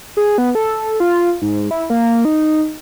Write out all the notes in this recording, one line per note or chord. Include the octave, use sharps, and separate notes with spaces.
G#4
B3
A4
F4
G#2
E4
A#3
D#4